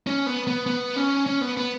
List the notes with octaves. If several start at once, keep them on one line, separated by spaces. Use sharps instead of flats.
C#4
B3
B3
B3
C#4
C#4
B3
B3